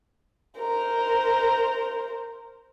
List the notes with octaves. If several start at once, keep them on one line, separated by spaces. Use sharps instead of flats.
A#4 C5